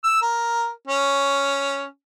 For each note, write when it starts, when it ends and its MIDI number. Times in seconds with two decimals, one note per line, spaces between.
0.04 0.21 88
0.22 0.70 70
0.88 1.86 61